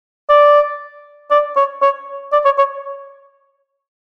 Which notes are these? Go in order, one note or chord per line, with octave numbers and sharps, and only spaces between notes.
D5
D5
C#5
C#5
D5
C#5
C#5